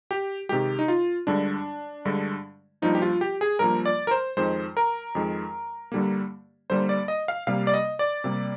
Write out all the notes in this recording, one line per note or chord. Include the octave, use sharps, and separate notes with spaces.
G4
C3 D#3 G#3 G4
D#4
F4
G2 D3 G#3 D4
G2 D3 G#3
G2 F3 A#3 D#4
G4
F4
G4
G#4
G2 F3 A#3 A#4
D5
A#4
C5
F2 D#3 G#3 C5
A#4
F2 D#3 G#3
G2 D3 G3 A#3
G2 D3 G3 A#3 C5
D5
D#5
F5
C3 G3 A#3 F5
D5
D#5
D5
C3 G3 A#3